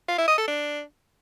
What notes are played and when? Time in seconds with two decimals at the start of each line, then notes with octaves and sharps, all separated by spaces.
0.08 F4
0.18 E4
0.28 D#5
0.38 A4
0.48 D4